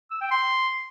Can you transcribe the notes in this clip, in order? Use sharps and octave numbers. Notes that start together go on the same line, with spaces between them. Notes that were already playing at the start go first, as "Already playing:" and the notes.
E6
G5
C6